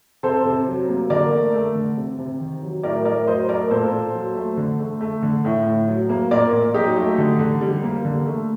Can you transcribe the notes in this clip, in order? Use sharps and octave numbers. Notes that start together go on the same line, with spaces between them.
C3 A4 C5
C3
F#3
A#3
D3 A#4 D5
A3
A3
D3
C3
C3
D#3
F#3
A2 A#4 D5
A2 A#4 D5
F#3 C5 D#5
A3 A#4 D5
A#2 A4 C5
A#2
F#3
A3
D3
A3
A3
D3
A2
A2
F#3
A#3
A#2 A#4 D5
A#2
F#3 D#4 G4
A3
D3
D3
G3
A#3
D3
A3